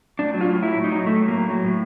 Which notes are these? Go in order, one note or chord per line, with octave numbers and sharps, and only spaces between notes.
A2 D4
F#3
F4
A2
F#3 E4
A2
D#4
F#3
A2 A3
F#3
A#3
A2
F#3
A2